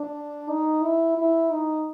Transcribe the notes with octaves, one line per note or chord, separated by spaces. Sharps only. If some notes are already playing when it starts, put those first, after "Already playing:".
Already playing: D4
D#4
E4
E4
D#4